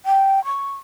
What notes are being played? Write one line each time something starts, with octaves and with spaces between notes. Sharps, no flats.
G5
C#6